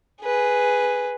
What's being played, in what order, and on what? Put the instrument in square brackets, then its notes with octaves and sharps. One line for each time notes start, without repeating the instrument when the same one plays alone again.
[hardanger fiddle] G#4 B4